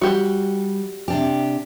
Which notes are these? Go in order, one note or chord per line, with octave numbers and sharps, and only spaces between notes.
G3 F#4 G4
C3 D4 G4